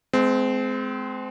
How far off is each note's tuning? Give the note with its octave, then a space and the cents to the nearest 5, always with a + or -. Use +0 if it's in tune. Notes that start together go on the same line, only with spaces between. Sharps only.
G#3 +30 C4 -25